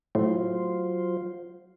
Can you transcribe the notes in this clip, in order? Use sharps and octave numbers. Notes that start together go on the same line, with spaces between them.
A2 F#3 F4 C5